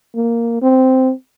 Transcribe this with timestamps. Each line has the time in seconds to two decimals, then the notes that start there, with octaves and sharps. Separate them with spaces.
0.15 A#3
0.62 C4